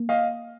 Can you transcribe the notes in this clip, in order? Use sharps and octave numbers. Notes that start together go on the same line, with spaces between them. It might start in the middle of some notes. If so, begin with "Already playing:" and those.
Already playing: A#3
D#5 F5